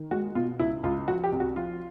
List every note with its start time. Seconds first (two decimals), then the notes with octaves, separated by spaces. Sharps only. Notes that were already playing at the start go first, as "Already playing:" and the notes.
Already playing: D#3
0.11 G#3 F#4
0.35 B2 F4
0.59 C#2 E4
0.83 C#2 F4
1.08 F3 F#4
1.24 G4
1.32 C2
1.40 F#4
1.56 F3 F4